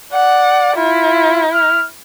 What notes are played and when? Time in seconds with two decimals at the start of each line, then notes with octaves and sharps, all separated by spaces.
0.13 D5 F#5
0.77 E4 F4
1.54 F6